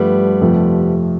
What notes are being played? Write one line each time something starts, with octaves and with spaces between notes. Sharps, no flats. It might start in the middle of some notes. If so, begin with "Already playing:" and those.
Already playing: G2 F3 G3 A3 B3
F2 C3 F3 A3